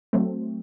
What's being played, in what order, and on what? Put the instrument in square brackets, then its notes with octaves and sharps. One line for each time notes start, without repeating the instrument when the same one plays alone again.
[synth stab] F#3 A3 C4